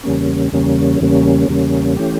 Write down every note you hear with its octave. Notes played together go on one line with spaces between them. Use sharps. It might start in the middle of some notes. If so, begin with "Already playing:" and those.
E2 C#3 G3 A#3 C#4
E2 C#3 G3 A#3 C#4
E2 C#3 G3 A#3 C#4
E2 C#3 G3 A#3 C#4
E3 A3 C#4 G4